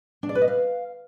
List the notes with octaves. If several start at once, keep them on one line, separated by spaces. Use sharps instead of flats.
D4
D5
B4
D#5
F5